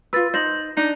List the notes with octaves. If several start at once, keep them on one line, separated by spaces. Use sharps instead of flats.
F4 B4 E6 A6
D#4 C5 G6 A#6 F#7
D4 D#4